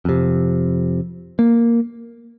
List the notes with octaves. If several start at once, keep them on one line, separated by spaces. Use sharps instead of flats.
F2 C3
A#3